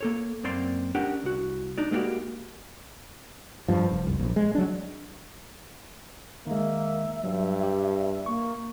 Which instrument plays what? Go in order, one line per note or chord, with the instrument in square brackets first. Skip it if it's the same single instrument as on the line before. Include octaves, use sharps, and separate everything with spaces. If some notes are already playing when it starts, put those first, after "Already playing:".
[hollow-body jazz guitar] A#3 A4 C#5
F#2 A#3 C4 D5 C6
C#4 D4 G4 A#4 F#5 G5
C2 F#4
D4 D#4 D5
G#3 A#3 B3 F#4 G4
[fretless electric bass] G2 F3
F1
C2
A#1
G#3
F#3 D4
[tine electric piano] D#3 G#3 [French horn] A#3 [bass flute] E5
[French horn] G2 [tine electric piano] F#3
[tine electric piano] G4
[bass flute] A#3 [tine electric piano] C#6